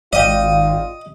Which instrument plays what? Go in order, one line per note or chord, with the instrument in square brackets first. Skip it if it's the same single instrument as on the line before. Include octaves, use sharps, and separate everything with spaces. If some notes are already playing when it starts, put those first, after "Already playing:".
[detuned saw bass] G#1 [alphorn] F4 [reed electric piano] D5 F5 G5 [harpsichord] D#5